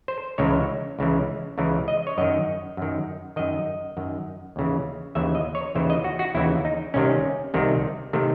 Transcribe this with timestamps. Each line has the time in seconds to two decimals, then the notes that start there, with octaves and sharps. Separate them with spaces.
0.08 C5
0.38 C#2 C#3 E3 C#5
0.99 C#2 C#3 E3
1.58 C#2 C#3 E3
1.88 D#5
2.07 C#5
2.18 F#2 D#3 D#5
2.77 F#2 D#3
3.36 F#2 D#3 D#5
3.97 F#2 D#3
4.56 D#2 C#3 E3
5.15 D#2 C#3 E3 E5
5.35 D#5
5.55 C#5
5.75 D#2 C#3 E3 C5
5.90 D#5
6.04 F#4
6.19 F#4
6.34 D#2 C#3 E3 E4
6.65 D#4
6.94 C2 C3 D#3 C#4
7.54 C2 C3 D#3
8.13 C3 D#3 A3